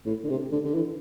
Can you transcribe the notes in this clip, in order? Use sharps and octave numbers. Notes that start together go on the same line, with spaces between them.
A2
D3
C3
D3
D3
E3